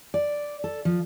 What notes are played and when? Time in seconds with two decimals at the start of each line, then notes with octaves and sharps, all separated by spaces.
0.14 D5
0.64 A4
0.85 F3